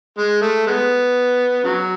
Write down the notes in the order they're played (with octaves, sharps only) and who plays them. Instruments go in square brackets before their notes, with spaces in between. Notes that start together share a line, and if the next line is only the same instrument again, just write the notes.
[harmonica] G#3
A3
G#3 B3
C#3 F#3